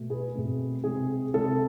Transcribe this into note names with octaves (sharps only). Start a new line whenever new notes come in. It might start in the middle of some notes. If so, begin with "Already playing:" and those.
Already playing: B2 A3
G#4 B4
B2 A3 C4
C3 G#3 C4 G#4
C3 G#3 C4 A4